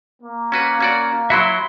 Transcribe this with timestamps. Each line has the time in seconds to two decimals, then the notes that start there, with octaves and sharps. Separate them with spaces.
0.23 A#3
0.52 C#4 F#4 B4
0.81 C#4 F#4 D5
1.30 F#3 E4 F#4 E5 B5 C6